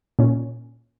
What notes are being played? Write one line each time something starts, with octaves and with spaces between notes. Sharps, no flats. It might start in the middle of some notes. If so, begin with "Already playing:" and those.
A#2 C#4